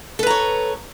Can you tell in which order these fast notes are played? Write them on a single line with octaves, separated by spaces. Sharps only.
A4 B4 A#5 C#5